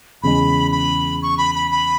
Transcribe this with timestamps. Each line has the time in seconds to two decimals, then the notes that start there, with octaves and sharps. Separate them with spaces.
0.22 E2 C#3 G#3 B5
0.72 B5
1.22 C#6
1.38 B5
1.55 B5
1.71 B5